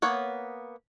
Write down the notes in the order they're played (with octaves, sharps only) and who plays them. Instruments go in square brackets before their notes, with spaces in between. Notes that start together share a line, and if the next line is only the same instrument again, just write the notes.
[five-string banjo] A#3 B3 C#5 F#5